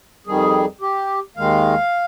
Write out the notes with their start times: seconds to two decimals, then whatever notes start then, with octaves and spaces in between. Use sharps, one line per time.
0.27 F2 D#3 G3 G#4
0.81 G4
1.36 D#2 D#3 G#3 F5